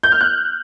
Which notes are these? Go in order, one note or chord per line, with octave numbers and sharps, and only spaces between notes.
G6
F6
F#6